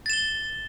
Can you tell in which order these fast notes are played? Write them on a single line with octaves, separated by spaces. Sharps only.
A6 E7 G7